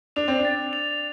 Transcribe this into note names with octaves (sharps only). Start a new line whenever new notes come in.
D4 F7
C4
D4
A6
F7